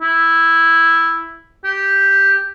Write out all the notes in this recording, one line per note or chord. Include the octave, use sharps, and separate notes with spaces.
E4
G4